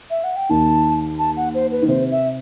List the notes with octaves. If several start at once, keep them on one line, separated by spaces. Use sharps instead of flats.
E5
F#5
G5
D#2 D#3 A5
A5
F#5
C5
B4
D#3
C3 C5
E5